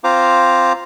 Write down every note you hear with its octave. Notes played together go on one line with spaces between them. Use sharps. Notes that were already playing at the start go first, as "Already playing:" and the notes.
C4 F4 C5 F5 A#5 D6